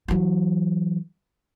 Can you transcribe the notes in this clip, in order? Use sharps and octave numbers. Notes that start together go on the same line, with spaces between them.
E3 F#3